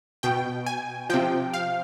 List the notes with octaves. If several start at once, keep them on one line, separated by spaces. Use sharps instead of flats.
B2 G5
G#5
C3 F3 G5
F5